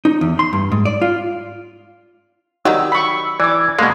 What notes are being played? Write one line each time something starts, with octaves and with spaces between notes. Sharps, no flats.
D#4
E2
C6
G2
G#2
D5
F4
D#3 F#3 G3 D#4 E6
B5 C#6
E3 D5 D6 G#6
B2 G#3 A#3